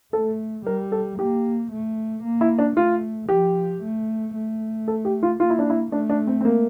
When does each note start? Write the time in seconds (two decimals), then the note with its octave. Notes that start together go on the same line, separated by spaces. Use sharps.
0.13 A3 A4
0.66 G3 A#4
0.92 A4
1.19 A#3 G4
1.71 A3
2.24 A#3
2.41 E4
2.58 D4
2.76 A3 F4
3.29 F3 G4
3.82 A3
4.35 A3
4.88 A4
5.05 G4
5.23 F4
5.40 A#3 F4
5.50 E4
5.59 D4
5.70 E4
5.92 A3 D4
6.09 D4
6.27 C4
6.41 C4
6.45 A#3